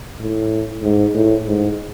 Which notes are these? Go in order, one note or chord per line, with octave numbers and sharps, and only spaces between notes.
A2
G#2
A2
G#2